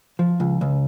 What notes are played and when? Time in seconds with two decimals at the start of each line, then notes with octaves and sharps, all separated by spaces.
0.19 F3
0.40 C#2
0.61 C#2